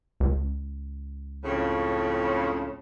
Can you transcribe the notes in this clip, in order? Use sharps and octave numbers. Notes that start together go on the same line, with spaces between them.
C#2
F2 A2 C#3